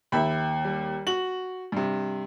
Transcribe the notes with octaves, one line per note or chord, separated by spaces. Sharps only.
D#2 E5 B5
G3
F#4 F#7
G2 C3